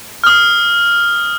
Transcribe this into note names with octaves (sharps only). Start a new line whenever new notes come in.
D#6 F6